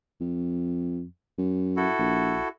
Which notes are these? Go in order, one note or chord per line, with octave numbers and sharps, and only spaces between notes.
F2
F#2
E4 F#4 A4
A#1